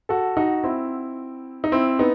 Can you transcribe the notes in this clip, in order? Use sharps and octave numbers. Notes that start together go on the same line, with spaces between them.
F#4 A4
D#4 F#4
C4 E4
D#4
C4 E4
B3 D#4